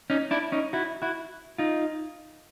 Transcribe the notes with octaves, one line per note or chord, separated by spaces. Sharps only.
C#4 D#4
D4 E4
C#4 D#4
E4 F#4
E4 F#4
D#4 F4